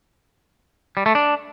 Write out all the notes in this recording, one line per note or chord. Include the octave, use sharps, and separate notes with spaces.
G3
A3
D4